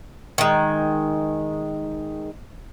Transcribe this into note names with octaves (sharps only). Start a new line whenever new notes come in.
D#3 G#3